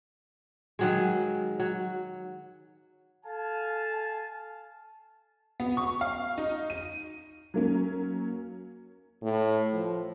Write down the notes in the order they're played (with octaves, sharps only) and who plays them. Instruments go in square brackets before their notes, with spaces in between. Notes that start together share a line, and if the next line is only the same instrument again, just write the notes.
[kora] D#3 F#3 G#3
F#3
[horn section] A4 F5 G#5 A5
[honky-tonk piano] B3
C#6
F5
D#4
D#7
F#3 A#3 C#4
[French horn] A2
F3